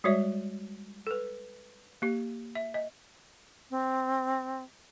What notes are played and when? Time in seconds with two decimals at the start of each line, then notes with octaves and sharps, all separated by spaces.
0.04 G3 G#3 F#4 C#5 D5 E5
1.07 A4 B4
2.02 A#3 G4
2.55 E5
2.74 D#5
3.70 C4